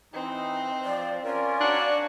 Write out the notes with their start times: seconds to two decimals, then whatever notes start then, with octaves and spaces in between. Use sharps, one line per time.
0.13 E3 C4 D#4
0.84 F3 D5
1.25 C#4 F4 A#4 D5
1.61 D4 F#4 C#5